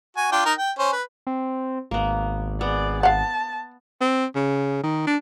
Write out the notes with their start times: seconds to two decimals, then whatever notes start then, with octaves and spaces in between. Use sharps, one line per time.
0.17 F#4 G#5
0.32 D4 F4 G5
0.45 D#4 A#4
0.58 G5
0.79 C#4 C5
0.93 B4
1.27 C4
1.91 G#1 A#3 B3
2.61 B3 G#4 D5
3.03 F5 F#5 A5
4.01 C4
4.35 C#3
4.83 D#3
5.07 D4